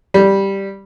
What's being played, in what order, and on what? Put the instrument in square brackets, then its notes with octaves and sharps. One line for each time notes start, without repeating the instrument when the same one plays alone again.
[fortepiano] G3